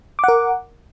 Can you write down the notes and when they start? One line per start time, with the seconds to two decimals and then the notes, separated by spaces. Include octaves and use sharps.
0.19 D6
0.24 F#5
0.28 A#4